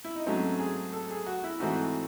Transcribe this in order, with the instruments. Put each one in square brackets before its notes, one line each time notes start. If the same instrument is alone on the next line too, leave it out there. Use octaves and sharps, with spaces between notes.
[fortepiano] E4
D#4
G#2 F#3 A3 C4 C#4
G#4
A4
G#4
F#4
E4
G#2 E3 A3 C4 F#4